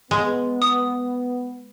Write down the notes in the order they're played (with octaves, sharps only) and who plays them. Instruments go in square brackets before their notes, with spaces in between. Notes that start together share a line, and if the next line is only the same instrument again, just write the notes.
[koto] G#3 [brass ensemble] B3
[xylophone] D#6